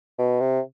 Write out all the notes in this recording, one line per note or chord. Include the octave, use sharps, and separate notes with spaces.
B2
C3